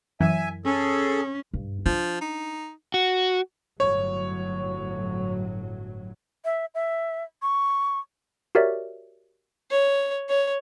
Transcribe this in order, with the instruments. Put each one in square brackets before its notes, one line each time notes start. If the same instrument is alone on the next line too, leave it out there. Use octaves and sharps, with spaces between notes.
[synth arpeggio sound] F#2 E3 [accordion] E5 G#5
[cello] C#4 [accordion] G#4 A4
[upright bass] G2
[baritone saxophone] F3 [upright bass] D4
[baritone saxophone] D#4
[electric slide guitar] F#4
[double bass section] G1 A2 F#3 [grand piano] C#5
[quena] E5
E5
C#6
[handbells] F#4 G4 A#4 C#5 D5 E5
[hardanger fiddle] C#5
C#5